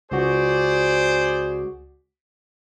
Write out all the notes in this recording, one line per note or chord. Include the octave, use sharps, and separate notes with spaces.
C#2 F#4 G#4 C5 D5